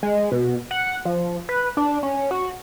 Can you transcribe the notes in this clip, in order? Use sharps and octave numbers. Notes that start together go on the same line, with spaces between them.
G#3
B2
F#5
F3
B4
D4
C#4
F#4